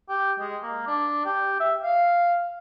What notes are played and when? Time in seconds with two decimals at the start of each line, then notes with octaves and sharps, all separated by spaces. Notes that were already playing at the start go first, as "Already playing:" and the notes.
0.09 G4
0.40 G#3
0.63 A#3
0.87 D4
1.25 G4
1.60 E5
1.83 F5